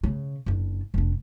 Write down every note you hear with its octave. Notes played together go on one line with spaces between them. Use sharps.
C#3
F#1 D4
F1 D4